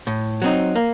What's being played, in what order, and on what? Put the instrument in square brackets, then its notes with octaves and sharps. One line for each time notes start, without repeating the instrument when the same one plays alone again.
[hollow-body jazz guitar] A2
F#3 C4 D#4
A#3